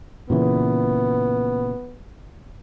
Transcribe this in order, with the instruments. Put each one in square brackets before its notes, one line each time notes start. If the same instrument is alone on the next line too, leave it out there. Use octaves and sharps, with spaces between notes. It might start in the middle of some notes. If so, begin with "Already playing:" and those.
[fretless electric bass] A#2 C#3 E3 [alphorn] B3